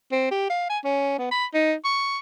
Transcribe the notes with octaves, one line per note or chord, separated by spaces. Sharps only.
C4
G4
F5
G#5
C#4
B3
B5
D#4
C#6